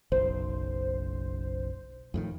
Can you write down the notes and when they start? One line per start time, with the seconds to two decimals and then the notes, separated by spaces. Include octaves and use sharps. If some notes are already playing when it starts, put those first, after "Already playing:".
0.12 F#1 B1 C5
2.14 F2 A2 D#3